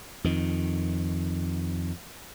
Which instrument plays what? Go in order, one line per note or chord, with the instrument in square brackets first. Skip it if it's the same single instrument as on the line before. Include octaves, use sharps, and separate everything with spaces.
[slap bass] F2 D#3